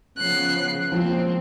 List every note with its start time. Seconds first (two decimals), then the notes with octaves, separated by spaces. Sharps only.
0.18 C#3 F3 B3 F#6 C7
0.92 F3 G#3 A#3 C4